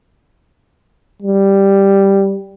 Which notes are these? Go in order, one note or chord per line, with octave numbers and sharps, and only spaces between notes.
G3